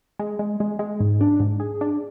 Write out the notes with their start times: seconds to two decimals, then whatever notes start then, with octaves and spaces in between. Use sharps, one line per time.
0.19 G#3
0.39 G#3
0.60 G#3
0.79 G#3
1.00 G#2
1.21 D4
1.40 G#2
1.60 G#4
1.81 D4